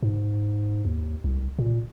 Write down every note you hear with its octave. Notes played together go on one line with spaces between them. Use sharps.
G#2
D#2
C2
A#2